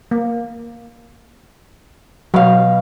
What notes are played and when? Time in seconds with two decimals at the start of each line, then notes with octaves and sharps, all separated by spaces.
0.11 A#3
2.34 B2 F#3 F5